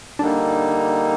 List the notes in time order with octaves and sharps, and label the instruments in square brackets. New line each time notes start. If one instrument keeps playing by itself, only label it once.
[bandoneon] D3 G3 A#3 D#4 [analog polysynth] D4